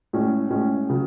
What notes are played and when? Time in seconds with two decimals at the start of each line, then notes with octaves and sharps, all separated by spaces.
0.13 A2 G#3 C#4
0.50 A2 G#3 C#4
0.90 C#3 F#3